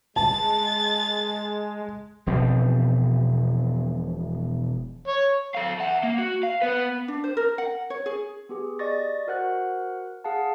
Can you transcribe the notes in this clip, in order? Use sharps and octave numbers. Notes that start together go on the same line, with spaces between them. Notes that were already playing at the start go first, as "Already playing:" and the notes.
G#3 A5 A6
E1 B2 F3 C4
C#5
A4 F5
E5 F#5
A#3
F#4
F5
B3 B4
D4
C5
A#4
F#5
C#5
G#4
B3 G4 G#4
D5 D#5 C#6 A6 A#6
F#4 A#4 C5 F#5 F#6
G#4 F5 F#5 A5